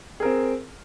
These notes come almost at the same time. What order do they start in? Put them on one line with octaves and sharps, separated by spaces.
G#4 A#4 C4